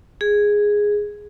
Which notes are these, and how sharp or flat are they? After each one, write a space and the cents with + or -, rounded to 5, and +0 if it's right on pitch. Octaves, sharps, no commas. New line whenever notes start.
G#4 -5